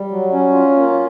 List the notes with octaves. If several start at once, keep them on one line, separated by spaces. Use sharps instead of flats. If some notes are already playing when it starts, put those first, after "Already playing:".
Already playing: G3
F#3
C#4
F4
A#3